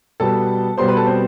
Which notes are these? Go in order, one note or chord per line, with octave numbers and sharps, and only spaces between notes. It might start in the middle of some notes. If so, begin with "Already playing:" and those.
B2 G3 B3 A4 A5
B2 G3 B3 C5 C6
B4 B5
A4 A5
C4 C5